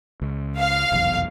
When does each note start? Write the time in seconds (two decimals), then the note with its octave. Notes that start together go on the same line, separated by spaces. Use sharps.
0.22 C#2
0.57 F5
0.92 F1 B1 E2